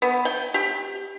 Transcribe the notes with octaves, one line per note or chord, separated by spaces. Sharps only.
B3
G5
G4